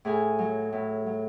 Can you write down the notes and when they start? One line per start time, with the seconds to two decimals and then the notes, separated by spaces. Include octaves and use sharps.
0.05 A2 G#4 G#5
0.39 F#3
0.73 A2
1.07 F#3